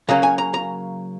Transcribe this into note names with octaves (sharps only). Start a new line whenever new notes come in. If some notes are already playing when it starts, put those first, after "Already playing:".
C#3 F#3 A#3 C#4 A#5
G#5
A#5
A#5